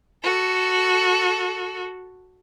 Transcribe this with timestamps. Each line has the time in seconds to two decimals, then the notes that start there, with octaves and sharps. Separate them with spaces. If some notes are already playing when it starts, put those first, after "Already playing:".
0.24 F#4 A4